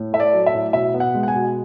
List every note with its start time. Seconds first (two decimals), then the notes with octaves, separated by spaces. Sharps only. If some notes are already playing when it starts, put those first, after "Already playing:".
Already playing: A2
0.13 A3 E5
0.20 D5
0.33 F#3
0.46 E5
0.54 A2
0.73 B2 E5
0.94 B3
1.00 F#5
1.14 G#3
1.23 F#5
1.28 G#5
1.34 B2